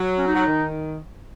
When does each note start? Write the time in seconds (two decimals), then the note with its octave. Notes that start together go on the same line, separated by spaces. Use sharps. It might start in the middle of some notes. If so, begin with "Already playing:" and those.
Already playing: F#3
0.17 C#4
0.27 D#4
0.35 F#3
0.46 D#3